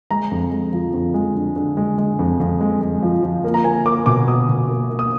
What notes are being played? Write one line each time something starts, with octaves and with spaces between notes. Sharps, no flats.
G#3 A#5
F2
G#3
F3
F2
G#3
D3
D3
G#3
G#3
F2
F2
G#3
G#3
F3
F3
A#3
A#5
A#3 G#5
A#3 D6
B2 D6
B2 D#6
B2
A#3
A#3
D#6